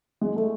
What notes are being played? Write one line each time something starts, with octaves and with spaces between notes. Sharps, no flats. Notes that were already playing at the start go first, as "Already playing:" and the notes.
G#3
A3